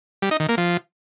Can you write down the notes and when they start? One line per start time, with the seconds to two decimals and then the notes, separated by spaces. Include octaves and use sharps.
0.22 G3
0.31 D#4
0.40 D#3
0.49 A#3
0.57 F3